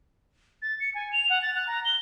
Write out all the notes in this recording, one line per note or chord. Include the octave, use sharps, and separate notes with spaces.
A6
C#7
G#5
F7
F#5
A6
F#6
A#5
G7